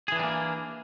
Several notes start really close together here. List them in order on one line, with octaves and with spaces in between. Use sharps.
G#4 E3 D4 G3 A#3